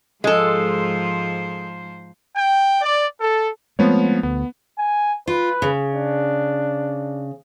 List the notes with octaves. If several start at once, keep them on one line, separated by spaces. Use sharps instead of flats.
G#2 F3 G#3 A4 C5
G5
D5
A4
F3 G#3 A3 B3 C4 C#5
D2 B3
G#5
F4 B4
C#3
D4